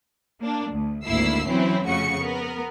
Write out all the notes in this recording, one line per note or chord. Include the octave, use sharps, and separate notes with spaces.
A#3 D4
D2
G#1 D2 A#3 E4 E6 C7
E3 F#3 C4 C#4 E4
F2 C#3 A3 F#4 C#6 C#7
B3 A#4